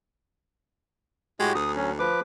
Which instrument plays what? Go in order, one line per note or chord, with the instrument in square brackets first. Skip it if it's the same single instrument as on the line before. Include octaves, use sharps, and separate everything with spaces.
[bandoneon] A2 F#4 G4 [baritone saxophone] G#3
[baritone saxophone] D2 [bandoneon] D#6
[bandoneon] F#3 C#4
F3 B4 D6